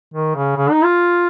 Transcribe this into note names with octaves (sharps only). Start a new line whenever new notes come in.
D#3
C#3
C#3
D#4
F4